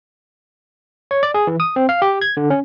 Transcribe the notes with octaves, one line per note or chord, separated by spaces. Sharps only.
C#5
D5
G#4
E3
D#6
C4
F5
G4
G#6
D3
C#4